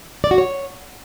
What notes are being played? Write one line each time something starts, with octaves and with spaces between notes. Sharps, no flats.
D5
F#4
C#5